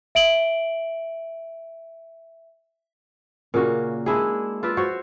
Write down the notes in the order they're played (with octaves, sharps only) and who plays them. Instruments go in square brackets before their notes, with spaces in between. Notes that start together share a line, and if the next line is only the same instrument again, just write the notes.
[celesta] E5 D7 F#7 G7
[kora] A#2 C#3 A#3 F#4
G#3 D4 E4 G#4
F4 B4 D5 E5
F#4 C5 C#5